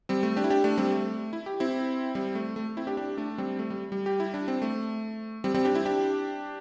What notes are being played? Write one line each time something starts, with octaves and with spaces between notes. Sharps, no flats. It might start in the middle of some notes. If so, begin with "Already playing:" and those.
G3 C4
A3
D4 G4
E4
D4 G4
A3 D4
G3 C4
A3
E4
G4
C4 E4
G3 C4
A3
A3
C4 E4
D4 G4
D4 G4
A3 D4
G3 C4
A3
G3
G3
G4
E4
D4
C4
A3
G3 C4
G3 C4
D4 G4
C4 E4
D4 G4